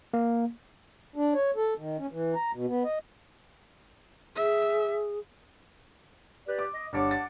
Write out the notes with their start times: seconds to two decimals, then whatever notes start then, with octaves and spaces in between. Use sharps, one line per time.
0.14 A#3
1.16 D4
1.34 C#5
1.56 A4
1.78 D#3
1.99 C#4
2.12 E3
2.35 A#5
2.54 B2
2.68 B3
2.85 D#5
4.36 G#4 E5
6.46 G4 B4 D5
6.59 D6
6.73 D#5
6.93 G1 G2 C#5 F#5 A5 D6
7.11 A6